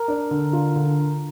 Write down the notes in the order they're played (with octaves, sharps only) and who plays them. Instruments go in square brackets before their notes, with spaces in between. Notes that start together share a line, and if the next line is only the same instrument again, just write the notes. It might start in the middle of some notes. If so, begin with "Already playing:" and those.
Already playing: [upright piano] A#4
[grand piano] D4
D3
F4
D3